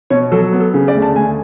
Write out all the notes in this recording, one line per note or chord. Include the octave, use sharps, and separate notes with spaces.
B2 C#5
F#3 A4
B3
A4
C#3
D5
D2
A5
D2 G#5